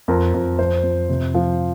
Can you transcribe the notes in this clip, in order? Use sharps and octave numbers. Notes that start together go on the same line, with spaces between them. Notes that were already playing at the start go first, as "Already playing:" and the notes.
F2 A#4
F2
F2 C5
F2
C3
F3